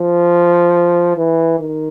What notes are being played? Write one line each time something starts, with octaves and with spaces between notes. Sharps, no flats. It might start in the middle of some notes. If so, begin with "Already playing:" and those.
Already playing: F3
E3
D#3